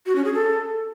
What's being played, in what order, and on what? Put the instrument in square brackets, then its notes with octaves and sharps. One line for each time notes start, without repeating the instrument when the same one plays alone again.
[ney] F#4
C#4
G#4
A4